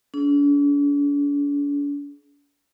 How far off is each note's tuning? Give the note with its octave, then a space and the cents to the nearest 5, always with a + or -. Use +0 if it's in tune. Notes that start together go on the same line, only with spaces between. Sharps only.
D4 -45 G#4 +40